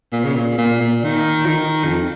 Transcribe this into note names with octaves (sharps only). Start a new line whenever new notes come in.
A#2
C#3
A#2
A#2
A#2
D#3
F3
D#3
F2